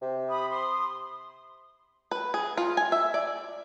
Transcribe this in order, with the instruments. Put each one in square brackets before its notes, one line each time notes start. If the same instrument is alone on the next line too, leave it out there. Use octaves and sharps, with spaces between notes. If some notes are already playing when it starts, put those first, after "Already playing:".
[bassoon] C3
[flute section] B5 D#6
C6 D#6
[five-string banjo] B4
G#4
F4
G#5
E5
D5